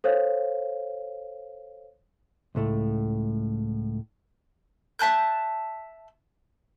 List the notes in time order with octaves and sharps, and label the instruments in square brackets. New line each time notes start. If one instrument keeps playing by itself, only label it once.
[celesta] A4 C5 C#5 F5
[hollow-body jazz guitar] C#2 A2 A3
[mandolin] E5 A5 F#6 G6